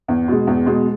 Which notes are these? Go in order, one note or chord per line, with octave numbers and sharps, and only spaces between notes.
E2
B2 G#3
E2
B2 G#3